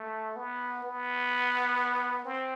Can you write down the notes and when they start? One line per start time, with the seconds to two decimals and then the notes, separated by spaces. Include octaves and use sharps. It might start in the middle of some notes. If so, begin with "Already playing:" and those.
Already playing: A3
0.36 B3
0.83 B3
2.25 C4